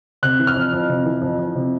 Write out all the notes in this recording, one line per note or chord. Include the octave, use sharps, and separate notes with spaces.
C3 F#6
E3
F6
F2
F2
C3
E3
F2
F2
C3